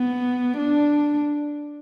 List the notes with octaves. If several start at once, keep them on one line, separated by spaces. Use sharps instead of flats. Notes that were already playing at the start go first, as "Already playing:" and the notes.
Already playing: B3
D4